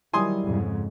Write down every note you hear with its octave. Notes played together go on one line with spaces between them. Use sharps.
D#3 F#3 G3 E4 G#5 C6 D#6
F2 G#2 C#3